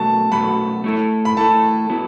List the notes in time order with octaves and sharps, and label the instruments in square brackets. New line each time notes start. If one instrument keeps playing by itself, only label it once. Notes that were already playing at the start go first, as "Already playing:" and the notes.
Already playing: [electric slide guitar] B2 F#3 A3 F#4 [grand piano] A5
[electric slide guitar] B2 F#3 A3 F#4 [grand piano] B5
[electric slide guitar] A3 E4 A4
[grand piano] B5
[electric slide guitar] A3 E4 A4 [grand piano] A5
[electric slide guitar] F#3 B3 E4